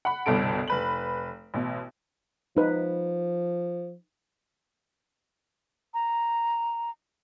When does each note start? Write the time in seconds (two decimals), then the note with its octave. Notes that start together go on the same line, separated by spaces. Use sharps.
0.05 F#5 B5
0.26 G1 C2 B2 A4 D7
0.68 F1 B4 F#7
1.54 A1 B2
2.57 F3 D#4 B4
5.94 A#5